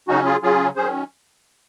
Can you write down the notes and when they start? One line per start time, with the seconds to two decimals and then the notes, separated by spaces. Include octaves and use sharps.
0.08 C#3 F#3 C#4 D#4 F#4
0.25 F4 G#4
0.42 C#3 F#3 C#4 F4 G#4
0.76 D#3 F#3 C#4 G#4 C5